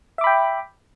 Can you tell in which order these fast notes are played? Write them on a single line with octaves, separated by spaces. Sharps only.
E5 D6 B5 G5